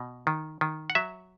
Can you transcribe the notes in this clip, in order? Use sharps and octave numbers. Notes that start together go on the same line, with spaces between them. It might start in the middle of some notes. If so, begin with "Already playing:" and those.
Already playing: B2
D#3
D#3
F#5
F#3 E5